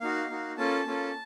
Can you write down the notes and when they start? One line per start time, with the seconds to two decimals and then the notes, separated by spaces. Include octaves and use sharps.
0.01 A#3 D#4 F#4 F5
0.29 A#3 D#4 F#4
0.57 A#3 C#4 F4 A4 A5
0.86 A#3 C#4 F4 A4